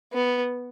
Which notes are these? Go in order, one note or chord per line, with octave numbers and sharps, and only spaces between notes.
B3